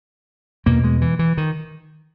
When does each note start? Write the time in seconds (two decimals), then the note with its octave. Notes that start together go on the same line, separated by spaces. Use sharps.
0.66 E2 B2 A#3
0.84 G#3
1.01 E3
1.19 E3
1.37 D#3